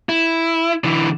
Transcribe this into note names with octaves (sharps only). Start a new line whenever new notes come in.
E4
D3 E3